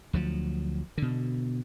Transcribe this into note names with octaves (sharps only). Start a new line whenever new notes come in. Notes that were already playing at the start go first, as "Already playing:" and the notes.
D2 F3 F#3
B2 D3